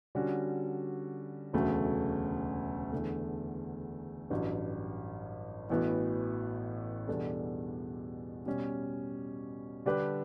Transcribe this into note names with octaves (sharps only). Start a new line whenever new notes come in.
D3 G3 C#4 F#4
E1 D2 C#3 F#3 A3
E2 D3 A3
A1 G2 F#3
A1 A2 E3 B3 F#4
E2 B2 G3 D4 A4
B2 G3 C#4
D3 G3 D4 G4 B4